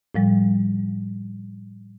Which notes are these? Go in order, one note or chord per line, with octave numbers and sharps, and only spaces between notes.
A2 F3 G3